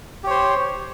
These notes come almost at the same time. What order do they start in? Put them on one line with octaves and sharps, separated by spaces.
G4 C#5 C5